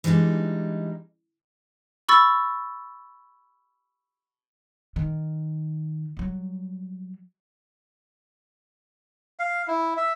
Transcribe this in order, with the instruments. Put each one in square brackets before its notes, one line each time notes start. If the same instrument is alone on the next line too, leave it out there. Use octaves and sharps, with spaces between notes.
[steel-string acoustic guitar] E3 G3 G#3 D4 D#4
[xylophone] B5 C#6 E6 A6
[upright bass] D#3
F#3 G3
[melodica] F5
E4
E5